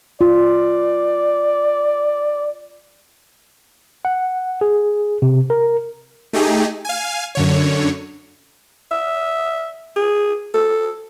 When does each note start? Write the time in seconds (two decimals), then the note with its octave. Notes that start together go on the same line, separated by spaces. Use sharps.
0.21 F4 D5
4.05 F#5
4.61 G#4
5.22 C3
5.50 A#4
6.33 A3 D#4 G4 G#4
6.85 F5 G#5
7.35 F#2 D3 C#5
8.91 E5
9.96 G#4
10.54 A4